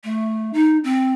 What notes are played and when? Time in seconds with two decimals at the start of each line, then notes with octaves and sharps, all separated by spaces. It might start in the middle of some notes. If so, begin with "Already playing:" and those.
0.04 A3
0.53 D#4
0.84 C4